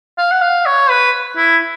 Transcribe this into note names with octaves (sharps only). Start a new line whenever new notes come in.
F5
F#5
F5
C#5
B4
E4